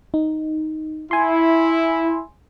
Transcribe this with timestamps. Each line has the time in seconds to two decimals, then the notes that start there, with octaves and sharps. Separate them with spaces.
0.14 D#4
1.11 E4 G#5 C6